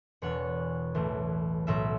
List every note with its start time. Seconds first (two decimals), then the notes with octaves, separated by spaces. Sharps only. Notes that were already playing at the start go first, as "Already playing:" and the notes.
0.22 E1 E2 B2 C#5 F#5
0.95 B1 A2 E3 A3
1.67 B1 A2 F#3 E5